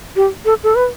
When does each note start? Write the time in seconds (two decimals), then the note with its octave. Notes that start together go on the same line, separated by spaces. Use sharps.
0.16 G4
0.45 A4
0.63 A4
0.75 B4